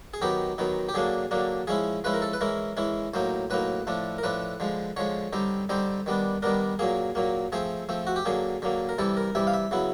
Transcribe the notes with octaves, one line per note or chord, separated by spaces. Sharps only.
G#4
D#3 F#3 B3 D#4 G4
D#3 F#3 B3 D#4
G4
D3 F#3 A#3 D4 G#4
D3 F#3 A#3 D4
F3 G#3 C#4 E4 G#4
F3 G#3 C#4 E4 B4
A#4
A4
B4
E3 G#3 C#4 E4 A#4
E3 G#3 C#4 E4
A2 F#3 A#3 D#4 C5
A2 F#3 A#3 D#4 B4
A2 F3 A3 D4
A#4
A2 F3 A3 D4 B4
D3 F3 G#3
D3 F3 G#3 C#5
D3 G3 C4 D#4
D3 G3 C4 D#4 C5
D#3 G3 B3 D4
D#3 G3 B3 D4 A#4
A#2 F#3 A#3 G#4
A#2 F#3 A#3
F3 A3 C4 G#4
F3 A3 C4
F#4
G4
D3 F#3 A#3 G#4
D3 F#3 A#3
A#4
C3 E3 G3 A4
A#4
C3 E3 G3 E5
F5
E5
C#3 F#3 B3 E4